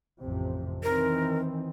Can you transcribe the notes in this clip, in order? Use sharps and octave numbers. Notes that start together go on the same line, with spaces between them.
A1 F2 C3
D#3 E3 C4 A#4